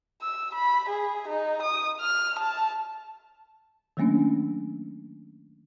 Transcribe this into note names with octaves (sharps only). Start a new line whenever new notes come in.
E6
B5
G#4
D#4
D#6
F6
A5
D#3 F#3 A3 A#3 C#4 D4